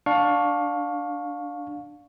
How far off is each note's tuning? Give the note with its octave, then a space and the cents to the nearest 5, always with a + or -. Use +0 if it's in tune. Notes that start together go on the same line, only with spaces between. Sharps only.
D4 +0 F5 +25 C#6 +0